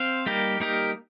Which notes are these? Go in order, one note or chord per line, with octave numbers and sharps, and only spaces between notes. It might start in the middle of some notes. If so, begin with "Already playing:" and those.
Already playing: C4 C5 F5
G3 A#3 D#4 G4 A#4
G3 A#3 D#4 G4 A#4